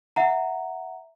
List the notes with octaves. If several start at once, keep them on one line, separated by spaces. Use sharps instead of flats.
E5 F#5 A#5